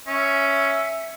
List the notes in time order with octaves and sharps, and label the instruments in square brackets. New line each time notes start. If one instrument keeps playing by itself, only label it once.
[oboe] C#4 [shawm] E5